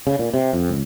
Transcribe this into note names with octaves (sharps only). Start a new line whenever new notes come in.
C#3
A#2
C3
F2
C#2